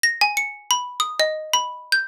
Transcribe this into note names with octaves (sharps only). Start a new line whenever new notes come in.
A#6
G#5
C#7
B5
D#6
D#5
B5
G6